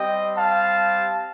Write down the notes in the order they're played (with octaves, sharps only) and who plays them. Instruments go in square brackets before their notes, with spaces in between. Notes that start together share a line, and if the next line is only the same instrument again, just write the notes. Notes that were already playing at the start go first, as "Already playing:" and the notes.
Already playing: [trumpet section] G3 C4 G4 D#5 G5
F5 A5